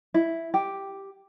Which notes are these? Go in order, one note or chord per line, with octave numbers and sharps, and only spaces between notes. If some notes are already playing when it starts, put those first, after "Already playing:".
E4
G4